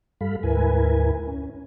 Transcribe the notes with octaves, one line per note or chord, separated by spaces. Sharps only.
G2 G3 A4 F5 B5
D2 G#2 E4 A#4 B4 G#5
C#4